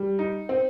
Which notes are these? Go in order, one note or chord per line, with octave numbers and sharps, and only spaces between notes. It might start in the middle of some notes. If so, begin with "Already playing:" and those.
Already playing: G3
D#4
C4